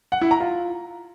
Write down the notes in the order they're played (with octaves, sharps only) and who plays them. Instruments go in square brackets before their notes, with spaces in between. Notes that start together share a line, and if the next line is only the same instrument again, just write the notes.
[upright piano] F#5
E4
A#5
F4